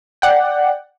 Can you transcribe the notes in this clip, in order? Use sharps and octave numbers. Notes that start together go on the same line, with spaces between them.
D5 F#5 G5